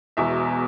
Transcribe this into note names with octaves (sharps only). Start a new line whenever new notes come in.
E1 E2 B2 E5